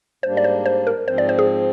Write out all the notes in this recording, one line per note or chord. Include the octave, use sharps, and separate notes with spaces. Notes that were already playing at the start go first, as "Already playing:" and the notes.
G#2 G3 A#3 D4 C5
D5
C5
C5
A#4
G#2 F3 C4 C5
D5
C5
G#4